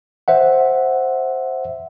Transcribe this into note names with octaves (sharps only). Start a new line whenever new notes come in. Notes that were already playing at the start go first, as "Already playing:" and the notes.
C5 E5 F#5